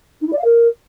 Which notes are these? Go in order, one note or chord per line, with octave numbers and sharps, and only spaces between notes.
D#4
E4
D5
F5
A#4